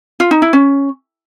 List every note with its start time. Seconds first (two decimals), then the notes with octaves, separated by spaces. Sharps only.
0.20 F4
0.31 D#4
0.42 E4
0.53 C#4